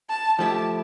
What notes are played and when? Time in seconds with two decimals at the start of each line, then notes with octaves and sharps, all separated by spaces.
0.09 A5
0.39 F3 A3 E4 G4 A5